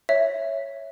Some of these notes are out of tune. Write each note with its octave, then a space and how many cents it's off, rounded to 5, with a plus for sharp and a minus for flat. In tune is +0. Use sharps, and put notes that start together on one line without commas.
C#5 +0 E5 +0